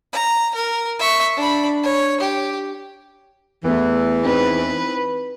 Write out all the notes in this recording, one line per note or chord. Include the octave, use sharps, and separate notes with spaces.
A#5
A#4
E5 C#6
D4 B5
C#5
G4
E2 E3 A3 B3
C4 D#4 B4